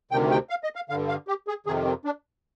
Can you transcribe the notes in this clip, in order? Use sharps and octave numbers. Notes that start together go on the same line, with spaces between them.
D2 C3 D#3 G5
G5
F5
D#5
F5
G2 D3 F5
F5
G4
G#4
F2 C3 D#3 G#4
C4
D4